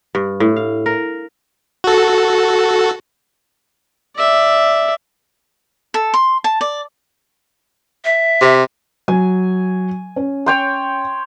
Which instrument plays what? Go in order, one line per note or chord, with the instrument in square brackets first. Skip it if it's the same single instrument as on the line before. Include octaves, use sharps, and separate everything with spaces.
[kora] G2
A2
F5
A#4
[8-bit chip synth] F#4 A4
[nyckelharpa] D5 E5
[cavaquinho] A4
C6
A5
D5
[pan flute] E5
[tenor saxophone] C3
[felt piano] F#3 [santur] G#5
[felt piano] C#4
[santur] C#5 G5 C6